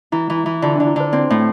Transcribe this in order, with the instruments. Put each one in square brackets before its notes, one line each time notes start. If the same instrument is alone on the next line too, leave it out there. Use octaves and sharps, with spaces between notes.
[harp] E3 [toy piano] E4
[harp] E3
[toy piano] E4
[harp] E3
[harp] D3 [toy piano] F4
[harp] D3 [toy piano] D4
[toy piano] E4
[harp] D3 [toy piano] C5
[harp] C4 [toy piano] D5
[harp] A2